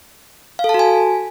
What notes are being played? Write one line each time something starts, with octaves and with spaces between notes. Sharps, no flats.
F5
A4
A5
F#4
G#5